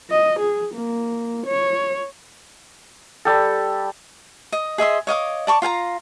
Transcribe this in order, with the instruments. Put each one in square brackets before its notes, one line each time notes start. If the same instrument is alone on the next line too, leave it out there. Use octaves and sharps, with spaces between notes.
[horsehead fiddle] D#5
G#4
A#3
C#5
[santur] G3 G4 A4
[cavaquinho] D#5
G#4 D#5 E5 C6
C#5 D#5 F5 D6
D5 A5 C#6 D6
F4 F5 G#5 A#5